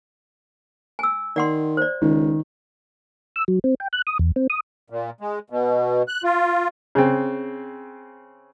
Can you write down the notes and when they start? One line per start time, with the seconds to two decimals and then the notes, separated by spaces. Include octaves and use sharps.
0.99 G#5 E6
1.36 D#3 D5 F#5 C6
1.77 C5 D5
2.02 C#2 D#3
3.36 E6
3.48 F#3
3.64 C4
3.80 G5
3.93 F#6
4.07 D#6
4.19 E2
4.36 C4
4.50 D#6
4.90 A#2
5.21 G#3
5.50 B2
6.08 F#6
6.24 F4
6.95 C#3 C4